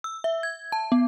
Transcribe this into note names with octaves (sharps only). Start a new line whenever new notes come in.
E6
E5
G#6
A5
B3